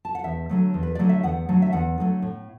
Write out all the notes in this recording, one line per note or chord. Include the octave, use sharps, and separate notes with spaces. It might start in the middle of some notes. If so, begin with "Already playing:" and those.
A5
F#5
E2 E5
D3 F#3 A3
E2
B4
D3 F#3 A3 D5
E5
E2 F#5
D3 F#3 A3
E5
E2 F#5
D3 F#3 A3
A2